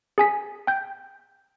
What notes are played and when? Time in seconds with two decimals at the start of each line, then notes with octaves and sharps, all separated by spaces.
0.18 G#4 G#5 B6
0.67 G5 G6